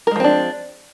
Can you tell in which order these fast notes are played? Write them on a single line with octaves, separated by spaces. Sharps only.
A#4 G#3 F3 C4 D4